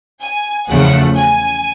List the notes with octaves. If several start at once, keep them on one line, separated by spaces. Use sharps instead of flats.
G#5
E2 C#3 F3 A3 F#5
G#5